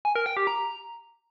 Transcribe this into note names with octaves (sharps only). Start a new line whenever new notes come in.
G#5
A#4
G5
G4
A#5